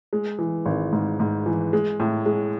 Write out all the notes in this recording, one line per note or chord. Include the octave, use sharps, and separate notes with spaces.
G#3
E3
G#1
G#2
G#2
E3
G#3
A2
G#3